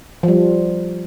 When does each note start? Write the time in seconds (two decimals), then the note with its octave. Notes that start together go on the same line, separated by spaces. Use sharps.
0.23 F3
0.28 G3